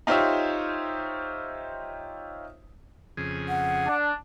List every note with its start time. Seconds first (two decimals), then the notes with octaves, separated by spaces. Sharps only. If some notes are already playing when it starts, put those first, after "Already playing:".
0.07 D#4 F4 G4 C5 C#5 E5
3.17 F2 C#3 G#4
3.49 F#5
3.86 D4